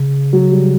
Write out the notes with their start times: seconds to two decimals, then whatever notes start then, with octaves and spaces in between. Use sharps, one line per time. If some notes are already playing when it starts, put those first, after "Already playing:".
Already playing: C#3
0.33 F#3
0.51 G3